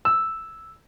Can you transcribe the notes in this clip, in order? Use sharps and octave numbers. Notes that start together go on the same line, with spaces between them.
E6